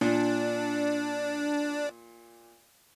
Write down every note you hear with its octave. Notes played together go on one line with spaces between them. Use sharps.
A#2 D4